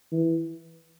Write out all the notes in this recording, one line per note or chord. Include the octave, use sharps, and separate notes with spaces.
E3